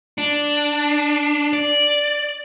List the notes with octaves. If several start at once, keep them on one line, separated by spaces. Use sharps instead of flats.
D4
D5